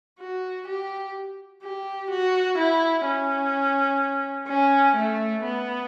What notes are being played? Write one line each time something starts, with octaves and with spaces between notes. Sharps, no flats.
F#4
G4
G4
F#4
E4
C#4
C#4
A3
B3